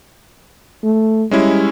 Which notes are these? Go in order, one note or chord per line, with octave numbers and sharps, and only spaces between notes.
A3
G3 G#3 C#4 E4